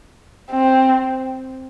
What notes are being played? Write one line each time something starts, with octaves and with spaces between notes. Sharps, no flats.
C4